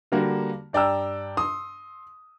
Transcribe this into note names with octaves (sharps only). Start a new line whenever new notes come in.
D3 G3 A#3 F#4
G2 D5 G5 A#5 E6
C6 D#6